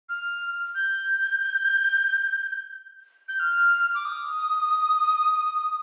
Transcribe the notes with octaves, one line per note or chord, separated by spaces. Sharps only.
F6
G6
G6
F6
D6
D#6